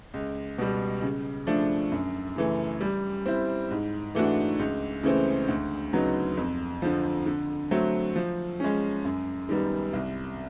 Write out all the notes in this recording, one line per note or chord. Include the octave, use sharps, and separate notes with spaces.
C#2
B2 G3
C#3
F3 A3 D4
F#2
C#3 E3 A3
G3
C4 E4
G#2
E3 A3 D4 F#4
C#2
C#3 E3 A3 C4
D2
C#3 F#3 B3 D#4
F2
D3 F3
D3
F#3 A3 C4
F3
G#3 C#4
F#2
D#3 G3 B3
C2